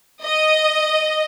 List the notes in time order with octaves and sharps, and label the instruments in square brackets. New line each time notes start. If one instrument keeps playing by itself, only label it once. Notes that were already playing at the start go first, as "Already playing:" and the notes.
[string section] D#5